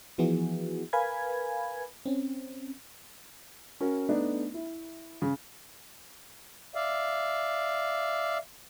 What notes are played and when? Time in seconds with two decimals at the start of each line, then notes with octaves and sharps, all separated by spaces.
0.18 E3 F3 B3 E4 F#4 G#4
0.93 A#4 B4 F5 G#5 B5 G#6
2.06 C4 C#4
3.81 C#4 F#4 A#4
4.09 A3 B3 D4 D#4
4.54 E4
5.22 C#3
6.75 D5 E5 F5